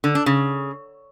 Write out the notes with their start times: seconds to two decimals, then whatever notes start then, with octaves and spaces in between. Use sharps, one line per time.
0.04 D3
0.15 D4
0.26 C#3